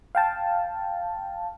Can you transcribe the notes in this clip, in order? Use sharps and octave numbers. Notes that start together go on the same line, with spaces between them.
F5 G5 A5